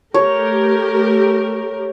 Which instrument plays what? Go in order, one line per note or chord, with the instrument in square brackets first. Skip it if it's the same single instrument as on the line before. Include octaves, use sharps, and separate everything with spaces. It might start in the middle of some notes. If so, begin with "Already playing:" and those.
[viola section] A3 G4 A#4 [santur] C#5